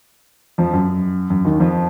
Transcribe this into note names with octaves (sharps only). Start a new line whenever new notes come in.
F2 F3
F#2
F#2
D#2 D#3
F2 F3